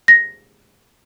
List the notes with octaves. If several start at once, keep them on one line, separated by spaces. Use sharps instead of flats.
A#6